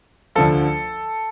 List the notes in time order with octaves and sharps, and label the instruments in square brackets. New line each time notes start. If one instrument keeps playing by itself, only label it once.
[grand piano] D2 D3 F3 A4